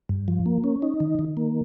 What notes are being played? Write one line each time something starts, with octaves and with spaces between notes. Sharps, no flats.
G2
F3
A#3
C#4
D#4
D#3
D#3
A#3